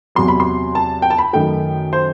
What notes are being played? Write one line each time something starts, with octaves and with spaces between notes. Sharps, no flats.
E2 C3 F#3 C6
B5
C6
A5
G5
A5
B5
F#2 D#3 A3 G5
C5